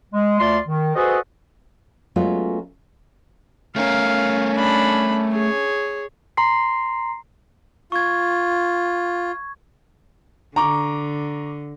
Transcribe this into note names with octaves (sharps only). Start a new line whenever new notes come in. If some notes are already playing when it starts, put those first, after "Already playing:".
G#3
D2 A3 F4 D5 C6
D#3
F#4 G#4 A4 B4 C5 D#5
F#3 G#3 A3 B3 C#4 F4
A3 C#4 A#4 F5
D4 B5
G#4 C#5
A#5 C6 C7
F4 C#6 G#6
D3 A#5 C#6 D6